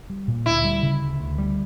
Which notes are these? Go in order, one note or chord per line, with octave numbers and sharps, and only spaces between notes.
G3
A#2
D2 E4
G3
C#3
D2
D2
G3